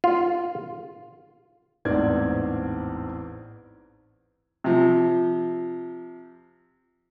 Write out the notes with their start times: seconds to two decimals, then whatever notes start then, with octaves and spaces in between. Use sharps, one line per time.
0.04 F4
1.85 A1 E2 G#2 C4 D5 G#6
4.64 C3 F3